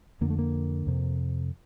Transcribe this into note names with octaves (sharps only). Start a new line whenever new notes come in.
F2 D3 A#3
A3
A#3
F2 C3